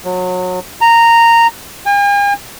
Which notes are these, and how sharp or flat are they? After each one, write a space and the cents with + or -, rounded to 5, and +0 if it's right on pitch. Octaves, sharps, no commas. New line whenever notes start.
F#3 -25
A#5 -10
G#5 -45